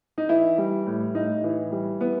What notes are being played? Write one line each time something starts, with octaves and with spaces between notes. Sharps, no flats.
D#4
E3 E4
G3
A2
A2 D#4
E3
G3
E3 B3